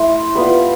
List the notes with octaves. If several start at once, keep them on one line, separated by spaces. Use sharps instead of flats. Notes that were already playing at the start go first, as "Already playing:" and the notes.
Already playing: A3 E4 C6
G3 B3 F4 B5